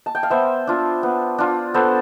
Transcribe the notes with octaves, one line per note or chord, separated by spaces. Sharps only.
A5
G5
F5
B3 C5 E5
D4 F4
B3
D4 F4
B3 A4 C5